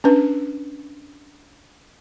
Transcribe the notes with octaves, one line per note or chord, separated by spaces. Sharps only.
C#4 D4 B4